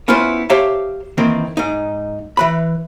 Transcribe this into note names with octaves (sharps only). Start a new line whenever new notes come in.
B3 C#4 E4 F4 B4 C5
G4 C5 C#5 E5 F5 A5
D#3 E3 A#3 C4
G#2 D#4
E3 B4 B5